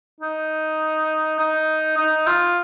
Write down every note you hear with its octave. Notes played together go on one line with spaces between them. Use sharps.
D#4
D#4
D#4
F4